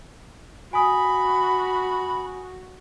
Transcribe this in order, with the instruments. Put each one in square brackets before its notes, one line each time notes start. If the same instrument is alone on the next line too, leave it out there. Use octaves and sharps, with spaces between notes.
[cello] F#4 [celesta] G#5 D#6 [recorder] B5